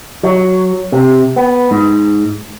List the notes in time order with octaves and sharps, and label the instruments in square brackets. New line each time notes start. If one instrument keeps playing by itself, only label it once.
[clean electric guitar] F#3
C3
B3
G#2